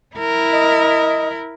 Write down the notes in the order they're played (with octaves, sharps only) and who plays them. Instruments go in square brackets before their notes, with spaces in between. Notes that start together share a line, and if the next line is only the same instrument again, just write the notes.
[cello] E4 A#4
[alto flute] D#5